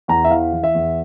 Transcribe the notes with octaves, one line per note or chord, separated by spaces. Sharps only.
E2 A#5
E5
E3 F5
E3
E5
E2